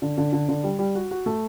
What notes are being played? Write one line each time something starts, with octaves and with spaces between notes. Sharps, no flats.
D3
D3
D3
D3
G3
G3
F#4
F#4
A3